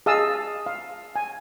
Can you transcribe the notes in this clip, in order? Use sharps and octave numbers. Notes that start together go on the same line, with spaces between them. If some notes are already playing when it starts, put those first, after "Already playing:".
G#4 D#5 F5 A5 D#6 E6
F5
G#5